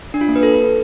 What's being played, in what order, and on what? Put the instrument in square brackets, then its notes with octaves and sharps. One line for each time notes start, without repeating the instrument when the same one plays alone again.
[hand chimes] D4
F4
A#3
B4
A4